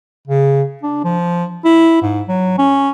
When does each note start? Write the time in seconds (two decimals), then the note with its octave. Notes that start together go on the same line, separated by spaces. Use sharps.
0.28 C#3
0.83 D4
1.04 F3
1.65 E4
2.02 G#2
2.29 F#3
2.58 C#4